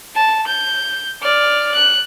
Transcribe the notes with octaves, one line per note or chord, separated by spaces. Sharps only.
A5
G6
D5 F6
F#6